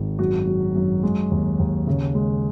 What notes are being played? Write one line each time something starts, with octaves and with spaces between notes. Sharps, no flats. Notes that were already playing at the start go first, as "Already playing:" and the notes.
Already playing: G#1
F#2 F#4
F#3
F#2
G#3
D#2
D#2
C#3
G#3